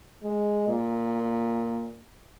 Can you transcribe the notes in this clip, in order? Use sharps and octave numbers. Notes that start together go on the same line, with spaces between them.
G#3
A#2